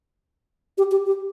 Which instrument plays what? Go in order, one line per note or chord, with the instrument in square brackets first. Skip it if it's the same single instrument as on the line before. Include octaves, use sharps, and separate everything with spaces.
[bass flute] G4
G4
G4